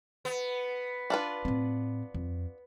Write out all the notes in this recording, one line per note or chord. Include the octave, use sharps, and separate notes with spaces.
B3
D4 F4 B4
A2 C4
F2